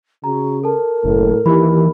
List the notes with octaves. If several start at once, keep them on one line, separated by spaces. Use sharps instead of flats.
C#3 F#4 A#5
A4 A#4 A5
F#1 A2
D#2 E3 G4 B5